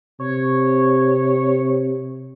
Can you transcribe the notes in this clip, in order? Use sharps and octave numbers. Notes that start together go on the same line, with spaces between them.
C3 C#5